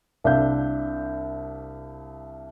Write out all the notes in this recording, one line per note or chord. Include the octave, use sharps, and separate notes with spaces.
C2 D4 E5 F5 G6